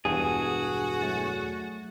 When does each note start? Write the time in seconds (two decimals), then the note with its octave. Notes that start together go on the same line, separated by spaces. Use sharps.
0.05 E1 E2 G2 F#4 G#4
1.02 F#3 A3 A6